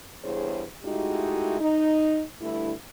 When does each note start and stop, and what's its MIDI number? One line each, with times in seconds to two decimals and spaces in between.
0.24 0.64 40
0.24 0.64 43
0.24 0.64 52
0.24 0.64 68
0.24 0.64 72
0.24 0.64 73
0.84 1.59 56
0.84 1.59 57
0.84 1.59 63
0.84 1.59 64
0.84 1.59 66
0.84 1.59 67
1.61 2.22 63
2.41 2.73 43
2.41 2.73 50
2.41 2.73 57
2.41 2.73 64